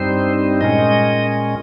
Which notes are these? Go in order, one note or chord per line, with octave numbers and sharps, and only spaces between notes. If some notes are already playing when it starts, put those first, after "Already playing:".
Already playing: G2 G3 C4 D#4 C5
A#2 G#3 C#4 D#5